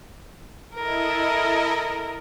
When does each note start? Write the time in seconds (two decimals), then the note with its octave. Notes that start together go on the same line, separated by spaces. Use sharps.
0.75 E4 A4 A#4 D#5